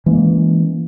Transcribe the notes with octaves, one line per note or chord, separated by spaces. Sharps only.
E3 G#3 A#3 C#4